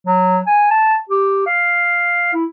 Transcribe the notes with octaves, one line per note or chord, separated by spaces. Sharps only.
F#3
G#5
A5
G4
F5
E4